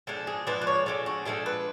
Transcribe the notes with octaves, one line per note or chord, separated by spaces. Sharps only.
F3 G#3 D4 A4
G#4
F3 G#3 D4 B4
B4
C#5
F3 G#3 D4 A4
F#4
F3 G#3 D4 A4
B4